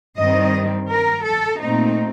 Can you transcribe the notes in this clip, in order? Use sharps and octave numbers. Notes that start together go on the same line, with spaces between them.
G2 D#3 G3 C4 D#5
A#4
A4
A#2 A3 C4 D#4